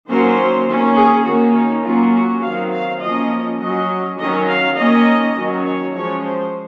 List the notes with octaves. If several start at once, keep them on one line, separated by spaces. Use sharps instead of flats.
D#3 F#3 A#3 C#4 C5
D#3 A#3 C#4
G#4
D#3 A#3 C#4 F#4
D#4
F#3 A#3 C#4 F4
F#4
D#3 F#3 C4 F5
F5
F3 A#3 C#4 D#5
F#3 C#4 D#5
D#3 F#3 C#4 D#5
F5
D#3 A#3 C#4 D#5
D#3 F#3 C#4
C#5
F3 G#3 C#4 C#5
C5